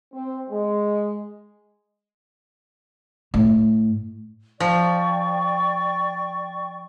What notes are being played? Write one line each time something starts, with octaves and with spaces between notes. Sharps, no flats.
C4
G#3
A2
F3 D5 G5 C#6